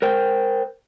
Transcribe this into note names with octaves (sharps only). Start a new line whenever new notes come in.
A#4 C5 G5